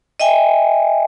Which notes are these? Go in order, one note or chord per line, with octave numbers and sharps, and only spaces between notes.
D#5 E5 G5 G#5